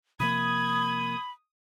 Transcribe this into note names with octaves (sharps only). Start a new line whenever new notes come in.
C3 F3 A#3 B5 D#6 G#6